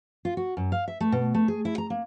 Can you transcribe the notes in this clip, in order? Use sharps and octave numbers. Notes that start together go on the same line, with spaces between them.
F4
F#4
F#2
F5
E5
A3
B2
A3
G#4
E4
A#5
A#3